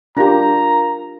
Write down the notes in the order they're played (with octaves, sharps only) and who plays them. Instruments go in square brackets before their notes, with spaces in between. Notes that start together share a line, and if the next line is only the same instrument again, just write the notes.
[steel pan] D4 G4 [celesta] F4 A#4 F5 [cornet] A#5